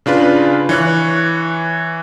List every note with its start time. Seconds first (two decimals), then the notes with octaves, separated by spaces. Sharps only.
0.06 C#3 D4 F4 B4
0.69 E3 C#5 F#6